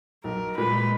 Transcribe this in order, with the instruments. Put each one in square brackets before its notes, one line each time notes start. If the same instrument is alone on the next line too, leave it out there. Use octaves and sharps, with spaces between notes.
[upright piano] B1 [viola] A#4
[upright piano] A#2 G#3 [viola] B4